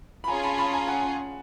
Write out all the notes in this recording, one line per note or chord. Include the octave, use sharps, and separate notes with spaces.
B5
C#4 F4 G#4 G#5 A#5
A5 B5
A5 B5
G#5 A#5
F#5 G#5